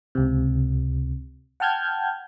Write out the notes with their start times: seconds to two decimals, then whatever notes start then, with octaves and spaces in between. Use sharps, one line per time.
0.15 C#2 C3
1.60 F#5 G5 A5 F6 G6 G#6